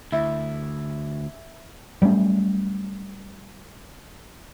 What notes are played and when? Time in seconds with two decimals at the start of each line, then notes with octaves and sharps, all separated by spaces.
0.12 D2 E4
2.02 F#3 G3 A3 C#4